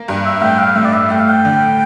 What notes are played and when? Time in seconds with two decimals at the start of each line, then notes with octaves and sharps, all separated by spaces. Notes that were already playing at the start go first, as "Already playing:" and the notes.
Already playing: A#3
0.08 G2
0.26 E5
0.42 A2 G5
0.59 F5
0.76 A2 E5
0.86 D5
0.94 E5
1.10 A3 G5
1.20 F5
1.30 G5
1.45 D3